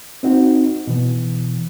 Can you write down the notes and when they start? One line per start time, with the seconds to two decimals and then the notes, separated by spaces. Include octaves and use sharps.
0.23 C4 D#4 F#4
0.87 B2 E3